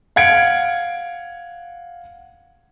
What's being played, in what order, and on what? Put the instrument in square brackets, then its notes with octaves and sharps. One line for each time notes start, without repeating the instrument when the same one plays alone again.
[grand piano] F5 F#5 G#6 C#7 D7